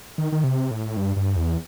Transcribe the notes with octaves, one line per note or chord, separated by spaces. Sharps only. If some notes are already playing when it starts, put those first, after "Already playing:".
D#3
D#3
C3
A2
G2
G2
E2